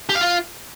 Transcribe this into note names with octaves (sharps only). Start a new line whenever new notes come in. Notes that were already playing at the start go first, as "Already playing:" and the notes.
G4
F5
F4